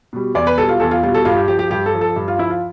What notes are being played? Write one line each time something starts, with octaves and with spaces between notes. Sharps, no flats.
B2 G3
E2 D5
B4
B2 G3 A4
F4
E2 A4
F4
B2 G3 F4
A4
G2 F4
G4
F3 G4
G4
G2 G4
A4
F3
A4
G2
F4
F3 E4
F4